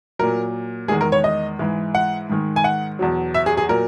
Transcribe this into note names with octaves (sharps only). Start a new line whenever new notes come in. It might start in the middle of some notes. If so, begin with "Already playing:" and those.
A#2 F#3 A#4
E2 D#3 G#3 G#4
A#4
C#5
D#5
G#2 E3 G#3
F#5
G#2 D#3 G#3
G#5
F#5
E2 B2 F#3
E5
G#4
G#4
A#2 F#3 A#4